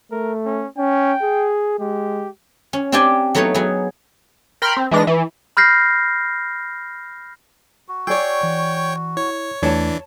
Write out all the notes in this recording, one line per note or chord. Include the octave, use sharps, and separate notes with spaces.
A3 A#4
C#4
C#4 G5
G#4
G#3 G4
C#4
C4 D4 G4 D5 G5 G#5
F#3 A3 B3 D#4 C#5
F#3 B3 G#4
A#4 G5 B5 C6 F6
C4
E3 G#3 D4 A#6
E3
B5 F6 G6 A#6 C7
F#4
G#4 C#5 D5 G5 E6
E3
E4 C#5
E2 E3 A3 D4 C#5 A5